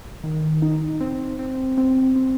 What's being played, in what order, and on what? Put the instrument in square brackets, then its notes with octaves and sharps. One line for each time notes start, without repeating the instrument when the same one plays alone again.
[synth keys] D#3
D#4
C4
C4
C4
C4